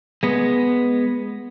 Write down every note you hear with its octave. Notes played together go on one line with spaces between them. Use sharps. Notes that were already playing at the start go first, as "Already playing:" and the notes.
G#3 B3